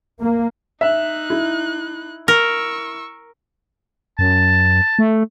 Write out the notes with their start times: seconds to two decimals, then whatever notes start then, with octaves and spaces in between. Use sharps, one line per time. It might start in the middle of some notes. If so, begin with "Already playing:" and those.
0.21 A#3
0.81 D#4 E5 F#6
1.30 E4
2.28 A#4 C#6 E6
4.19 F#2 A5
4.99 A3